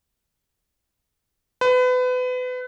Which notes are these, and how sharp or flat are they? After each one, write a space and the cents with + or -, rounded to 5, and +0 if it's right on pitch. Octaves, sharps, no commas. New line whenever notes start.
B4 +30